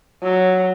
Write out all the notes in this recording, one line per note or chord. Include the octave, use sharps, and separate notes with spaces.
F#3